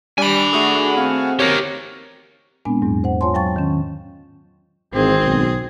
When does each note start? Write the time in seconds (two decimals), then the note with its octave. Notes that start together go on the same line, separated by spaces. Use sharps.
0.18 G3 D4 G#5 B5 D7
0.53 A3 F#4 G#4
0.97 C4 F5
1.39 G4 A#4 C#5
2.65 A#2 G#3 B3 C4 D4 G#5
2.82 E2 G#2 F#3
3.04 C5 F#5
3.21 F4 C#5 F#5 G#5 A5 C6
3.34 F#3 F5 G5 A5 C#6 A6
3.56 D#3 C#4
4.94 G#1 G#2 D#3 E3 C4 G#4
5.23 B1